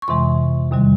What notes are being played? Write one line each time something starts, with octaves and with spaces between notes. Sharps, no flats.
C#6
F2 C3 E3 G#3 C6
E2 C3 D#3 G3